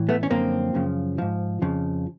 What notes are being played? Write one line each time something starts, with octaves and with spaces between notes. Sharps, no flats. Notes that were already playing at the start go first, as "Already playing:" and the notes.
Already playing: A2 E3
A3 B3
C#4
F#2 D3 F3 A#3 C4
F#2 C#3 F3
G#2 F3
F2 C#3 F3